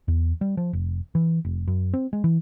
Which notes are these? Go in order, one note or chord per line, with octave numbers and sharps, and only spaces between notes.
E2
G3
F3
F1
E3
F1
F#2
C4
G#3
E3